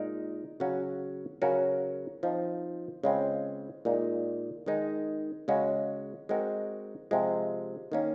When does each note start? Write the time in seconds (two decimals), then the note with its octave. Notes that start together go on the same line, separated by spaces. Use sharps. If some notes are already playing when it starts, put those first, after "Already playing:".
Already playing: A#2 G#3 D#4 A#4
0.60 C#3 F#3 C#4 F#4
1.42 C#3 F#3 C#4 F#4 A#4
2.23 F3 C4 D#4
3.04 C#3 G#3 C4 F4
3.85 A#2 G#3 D#4
4.66 D#3 G#3 D#4
5.48 C#3 G#3 C#4 F#4
6.29 G#3 C4 F#4 A#4
7.11 C3 F3 G#3
7.92 D#3 A#3 C#4